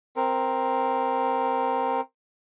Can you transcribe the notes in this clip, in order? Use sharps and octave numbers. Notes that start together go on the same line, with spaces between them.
C4 A#4